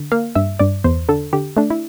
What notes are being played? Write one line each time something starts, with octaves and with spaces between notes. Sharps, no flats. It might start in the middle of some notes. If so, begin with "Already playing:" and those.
Already playing: D3
A#3 F5
G2 E5
G2 D5
E2 C5
D3 A4
D3 G4
A3 D4
E4